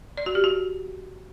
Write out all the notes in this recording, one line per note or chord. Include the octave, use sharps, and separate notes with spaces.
D5
F#4
G4
F#4